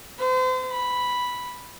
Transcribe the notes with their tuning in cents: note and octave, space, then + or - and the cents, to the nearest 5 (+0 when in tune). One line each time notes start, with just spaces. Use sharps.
C5 -35
B5 -5